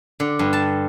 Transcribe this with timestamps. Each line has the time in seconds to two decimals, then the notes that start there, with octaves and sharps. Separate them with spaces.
0.20 D3
0.39 G2
0.53 A5